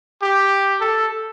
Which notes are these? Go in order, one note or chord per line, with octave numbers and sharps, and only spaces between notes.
G4
A4